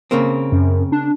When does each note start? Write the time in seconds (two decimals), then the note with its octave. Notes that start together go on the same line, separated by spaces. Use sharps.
0.11 C#3 A#3 C4
0.52 F#2
0.92 D4